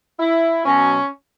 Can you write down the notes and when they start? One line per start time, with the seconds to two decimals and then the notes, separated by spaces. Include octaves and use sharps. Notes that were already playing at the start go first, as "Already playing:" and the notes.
0.18 E4
0.64 B2 F#3 C#4